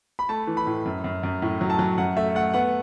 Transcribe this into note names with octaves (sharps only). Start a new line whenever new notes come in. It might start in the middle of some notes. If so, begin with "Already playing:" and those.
B5
A3 A5
E3
B5
A2
F#2
F#2
F#2
A2
F#3
A5
F#3
F#2 F#5
A3 E5
A3 F#5
B3 F#5